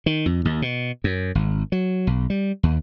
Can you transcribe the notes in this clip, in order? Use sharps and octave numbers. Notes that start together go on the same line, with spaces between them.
D#3
F2
D#2
B2
F#2
G#1
F#3
B1
G3
D#2